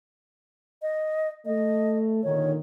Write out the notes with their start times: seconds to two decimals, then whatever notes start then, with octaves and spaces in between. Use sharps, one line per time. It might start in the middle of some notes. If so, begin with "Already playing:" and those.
0.82 D#5
1.46 A3 D#5
2.23 A#2 D3 D#3 C#5